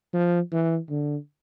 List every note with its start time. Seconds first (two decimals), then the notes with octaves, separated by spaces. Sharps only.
0.14 F3
0.52 E3
0.90 D3